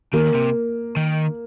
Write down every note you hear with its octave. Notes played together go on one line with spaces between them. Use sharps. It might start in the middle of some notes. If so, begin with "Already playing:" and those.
D#3 A#3
C3
D#3